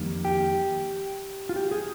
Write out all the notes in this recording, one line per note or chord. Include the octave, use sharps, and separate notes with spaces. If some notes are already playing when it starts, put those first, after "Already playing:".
Already playing: F2 D#3 G3 A#3
G4
F4
G4
G#4